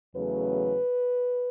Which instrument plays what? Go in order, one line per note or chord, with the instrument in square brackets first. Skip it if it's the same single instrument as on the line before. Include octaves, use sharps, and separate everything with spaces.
[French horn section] E2 C#3 F#3 A3 C#4 B4